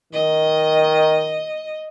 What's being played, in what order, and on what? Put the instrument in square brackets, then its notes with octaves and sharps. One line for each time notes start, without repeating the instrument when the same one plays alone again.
[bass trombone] D#3 [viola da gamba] D#5